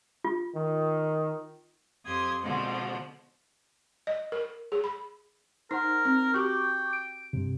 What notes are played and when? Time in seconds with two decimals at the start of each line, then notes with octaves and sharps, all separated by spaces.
0.24 F4
0.55 D#3
2.06 F2 G4 C6 D#6 G#6
2.43 B2 D3 F3 G#3 C4 F#4
4.07 D#5
4.32 A#4
4.72 G#4
4.84 B5
5.71 D#4 A#4 C5 F#5
6.05 C4
6.34 F#4 G4 G5 C#6 D6
6.93 D7
7.33 G2 C3